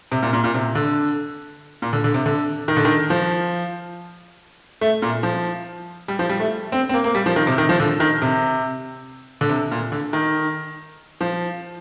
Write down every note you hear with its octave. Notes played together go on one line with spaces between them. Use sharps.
C3
A#2
A#2
A#2
C3
D3
A#2
D3
D3
C3
D3
D#3
D3
D#3
F3
A3
A#2
F3
G3
F3
G3
A3
C4
C4
A#3
A#3
G3
F3
D#3
C3
D#3
F3
D3
D#3
C3
D3
C3
A#2
D3
D#3
F3